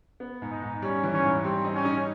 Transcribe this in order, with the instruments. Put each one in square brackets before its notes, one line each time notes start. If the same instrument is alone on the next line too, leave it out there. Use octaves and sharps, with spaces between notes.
[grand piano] B3
G#2
[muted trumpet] D#4
[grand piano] G#2
[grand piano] G3 [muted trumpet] C#4
[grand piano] E3
[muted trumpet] C#4
[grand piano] G#2
[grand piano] G3 [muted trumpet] C4
[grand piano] D#4
[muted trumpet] C#4
[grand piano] D#4